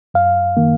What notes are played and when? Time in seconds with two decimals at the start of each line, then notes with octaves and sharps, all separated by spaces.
0.14 F#2 F5
0.57 D#3 A#3